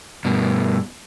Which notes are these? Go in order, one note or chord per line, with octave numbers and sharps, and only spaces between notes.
G2 B2